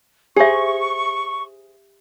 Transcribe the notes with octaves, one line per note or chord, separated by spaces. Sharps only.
G4 G#4 C5 E5 C#6